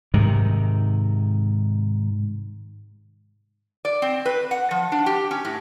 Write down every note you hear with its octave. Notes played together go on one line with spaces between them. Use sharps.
G#2 C3 D#3
D5
C4
B4
F#5
F3
D4
G4
C#4
A2